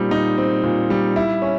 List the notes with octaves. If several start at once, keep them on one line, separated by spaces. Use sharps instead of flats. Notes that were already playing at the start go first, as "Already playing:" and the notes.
Already playing: A#2 G3 C4 D#4
D#4
C4
A#2
G3
E4
C#4